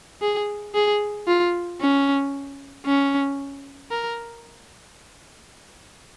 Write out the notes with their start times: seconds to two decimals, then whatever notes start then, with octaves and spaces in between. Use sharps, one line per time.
0.22 G#4
0.74 G#4
1.27 F4
1.80 C#4
2.86 C#4
3.91 A#4